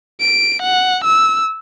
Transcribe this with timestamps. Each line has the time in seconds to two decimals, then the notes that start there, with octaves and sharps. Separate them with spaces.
0.21 D7
0.63 F#5
1.04 E6